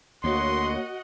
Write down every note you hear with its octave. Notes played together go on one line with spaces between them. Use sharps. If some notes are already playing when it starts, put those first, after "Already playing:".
D2 A#3 F#4 C#5 D#5 F#5 C6